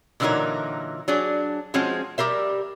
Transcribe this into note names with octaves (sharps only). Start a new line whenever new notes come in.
A#2 D3 E3 F#3 D#4 A#4
F#3 D4 G#4
F3 G#3 C4 C#4 F#4
G3 G4 A#4 C5 E5